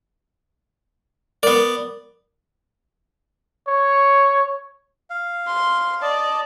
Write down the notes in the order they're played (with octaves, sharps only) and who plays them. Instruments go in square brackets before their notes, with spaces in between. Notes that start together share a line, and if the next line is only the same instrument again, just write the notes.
[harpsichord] B3 D5 [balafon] A#4
[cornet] C#5
[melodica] F5
[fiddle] C6
[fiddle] D5 [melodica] D#5 A5